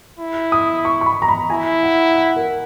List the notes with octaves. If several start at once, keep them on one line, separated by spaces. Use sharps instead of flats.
E4
D#6
C#6
C#6
B5
A#5
B5
E4 G#5
F#5
F#5
A#4